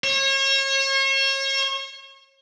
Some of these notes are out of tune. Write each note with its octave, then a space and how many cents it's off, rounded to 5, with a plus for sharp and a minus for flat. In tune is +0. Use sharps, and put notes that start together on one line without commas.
C#5 -35